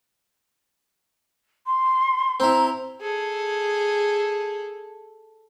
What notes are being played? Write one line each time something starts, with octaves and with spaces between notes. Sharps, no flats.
C6
C4 E4 A#5
G#4 A4